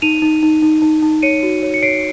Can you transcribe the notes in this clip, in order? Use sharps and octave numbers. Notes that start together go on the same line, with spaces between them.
D#4 D#7 F7
D#4
D#4
D#4
D#4
D#4
C#5 C#7 D#7
F#4
C#5
C#7
C#5 C7 D7